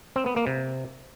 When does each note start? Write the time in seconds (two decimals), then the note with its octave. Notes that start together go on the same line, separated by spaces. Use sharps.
0.16 C4
0.26 B3
0.36 A#3
0.47 C3